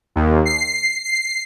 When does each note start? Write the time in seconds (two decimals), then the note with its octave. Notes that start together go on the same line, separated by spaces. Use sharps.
0.16 D#2
0.45 C7
1.04 C7